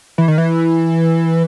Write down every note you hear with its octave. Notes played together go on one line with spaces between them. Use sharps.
E3
D#3
E3